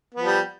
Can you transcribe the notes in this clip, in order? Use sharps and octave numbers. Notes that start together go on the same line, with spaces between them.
F3 G3 B3